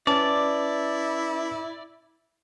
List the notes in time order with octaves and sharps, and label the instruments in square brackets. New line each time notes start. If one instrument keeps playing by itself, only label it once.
[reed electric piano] C#4 B4 A5 [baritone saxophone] E4 [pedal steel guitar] D5